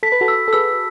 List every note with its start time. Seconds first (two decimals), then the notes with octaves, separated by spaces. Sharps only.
0.03 A4 B6
0.12 B4
0.21 F#4 A4
0.28 E6
0.48 A4
0.53 G#4 B4 E6